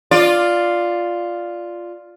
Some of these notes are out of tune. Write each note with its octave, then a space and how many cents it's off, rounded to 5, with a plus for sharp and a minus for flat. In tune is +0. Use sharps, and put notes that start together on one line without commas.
F4 +0 D5 +0